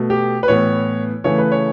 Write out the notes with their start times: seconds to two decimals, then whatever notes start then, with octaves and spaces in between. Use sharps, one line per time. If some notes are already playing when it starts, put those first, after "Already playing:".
Already playing: B2 A3
0.10 G4
0.43 B4
0.48 A2 E3 B3 C#5
1.24 C#3 E3 A3 C#5
1.38 B4
1.52 C#5